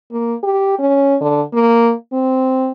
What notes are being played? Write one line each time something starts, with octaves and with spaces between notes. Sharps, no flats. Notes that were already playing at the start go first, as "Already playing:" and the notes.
A#3
G4
C#4
D3
A#3
C4